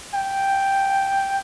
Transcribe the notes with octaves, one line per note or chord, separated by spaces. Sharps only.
G5